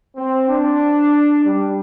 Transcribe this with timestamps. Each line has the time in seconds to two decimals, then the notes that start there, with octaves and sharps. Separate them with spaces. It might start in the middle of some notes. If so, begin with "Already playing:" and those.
0.16 C4
0.48 D4
1.44 G3